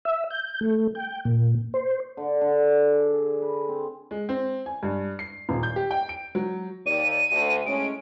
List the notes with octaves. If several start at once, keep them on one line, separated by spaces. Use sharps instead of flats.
E5
G6
A3
G5
A#2
C5
D3
D3
D5
G#4
G#4
B4
C4
G#3
C4
G#5
G2
C7
D#1
G6
G4
G5
D7
F#3
D#2 D5 D#7
D2
A2 G#3 C#4 D7